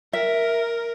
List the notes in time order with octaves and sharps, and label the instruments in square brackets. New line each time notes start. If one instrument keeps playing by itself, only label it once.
[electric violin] A#4 [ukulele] E5